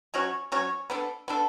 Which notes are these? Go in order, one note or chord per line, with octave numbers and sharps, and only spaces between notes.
F#3 C#4 F#4 C#5
F#3 C#4 F#4 C#5
B3 D4 A4
B3 D4 A4